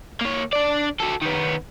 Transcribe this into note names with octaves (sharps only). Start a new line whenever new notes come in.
A#3 C#5
D4 D5
F#4 A4
D#3 B3